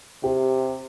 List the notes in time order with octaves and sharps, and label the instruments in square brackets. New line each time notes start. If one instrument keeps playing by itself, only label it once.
[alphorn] C3 [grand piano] G4